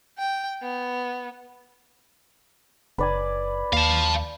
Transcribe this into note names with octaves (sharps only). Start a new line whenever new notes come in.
G5
B3
F#1 B4 D5 G#5
D#2 F5 A5